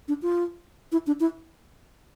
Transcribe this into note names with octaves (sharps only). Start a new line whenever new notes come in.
D4
F4
E4
D4
E4